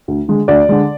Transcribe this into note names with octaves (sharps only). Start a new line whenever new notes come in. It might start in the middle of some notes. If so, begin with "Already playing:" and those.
D2
D3 G#3
D2 D5
D3 G#3